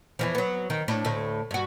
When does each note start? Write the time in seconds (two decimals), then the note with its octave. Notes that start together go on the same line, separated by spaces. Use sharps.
0.19 E2 E3 F3
0.35 F#3 B3
0.70 D#3
0.88 A2 D4
1.05 D2 A2
1.51 G2 F#4